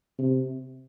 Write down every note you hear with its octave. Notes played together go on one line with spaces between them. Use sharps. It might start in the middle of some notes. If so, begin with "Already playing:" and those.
C3